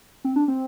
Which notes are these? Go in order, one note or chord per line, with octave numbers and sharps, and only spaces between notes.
C4
D4
C4